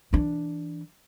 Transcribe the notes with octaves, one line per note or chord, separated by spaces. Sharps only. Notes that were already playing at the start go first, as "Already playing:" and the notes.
E3 D4